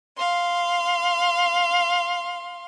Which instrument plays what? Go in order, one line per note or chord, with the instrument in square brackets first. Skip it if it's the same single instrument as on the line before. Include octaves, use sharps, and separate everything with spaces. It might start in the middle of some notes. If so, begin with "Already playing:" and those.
[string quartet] F5 C6